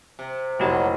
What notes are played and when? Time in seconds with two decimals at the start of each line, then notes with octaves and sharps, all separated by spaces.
0.19 C3
0.60 F1 A#1 F#3 E4 F#4 G4 D#5